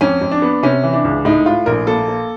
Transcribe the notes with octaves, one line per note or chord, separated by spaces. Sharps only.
F2 C#4
F2
D4
B3
C3 C#4
E3
D4
C#2
A2 D#4
A2 F4
A#1 A#4
A#3 A4
A#3